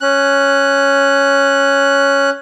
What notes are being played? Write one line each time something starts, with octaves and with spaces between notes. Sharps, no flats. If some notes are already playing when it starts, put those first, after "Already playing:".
C#4 F#6